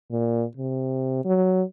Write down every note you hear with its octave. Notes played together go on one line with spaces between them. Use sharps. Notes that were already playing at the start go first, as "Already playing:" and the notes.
A#2
C3
F#3